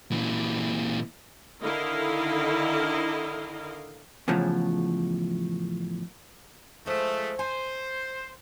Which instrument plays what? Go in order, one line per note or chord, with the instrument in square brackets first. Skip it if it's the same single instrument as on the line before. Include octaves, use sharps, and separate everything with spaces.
[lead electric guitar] A#2 E3
[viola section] D3 D#3 E4 A#4 D#5 F5
[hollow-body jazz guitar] E2 A2 C#3 F3 F#3
[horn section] F3 G#3 A3 [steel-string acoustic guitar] C5 D#5
[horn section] C5 [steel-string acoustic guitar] G#5